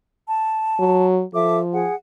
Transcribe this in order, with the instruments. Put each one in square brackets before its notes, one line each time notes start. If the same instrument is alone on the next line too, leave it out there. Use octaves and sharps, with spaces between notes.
[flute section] A5
[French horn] F#3
[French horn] F3 [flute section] A4 E5 D6
[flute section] G#4 F#5